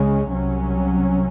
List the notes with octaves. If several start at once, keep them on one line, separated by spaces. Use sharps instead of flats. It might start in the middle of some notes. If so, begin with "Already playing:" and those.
Already playing: C#2 C#3 G#3 C#4
C2 C3 F#3 C#4